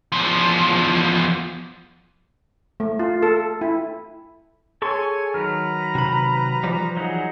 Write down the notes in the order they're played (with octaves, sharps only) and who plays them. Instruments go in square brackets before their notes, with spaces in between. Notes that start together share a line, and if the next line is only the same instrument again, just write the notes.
[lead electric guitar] E2 F3
[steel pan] A3
F4
A4
E4
[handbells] G#4 C6 [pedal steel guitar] A4 C#6 [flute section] C#5 G#5 G#6
[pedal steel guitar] D#3 F#3 [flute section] B4 A#5 [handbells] F6
[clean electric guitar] C3 B5
E3 F3 G3
[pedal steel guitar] F#3 D#4 [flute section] G#4 F#5